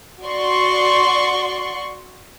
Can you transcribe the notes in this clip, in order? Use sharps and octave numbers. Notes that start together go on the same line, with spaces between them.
F#4 D5 C6 C#6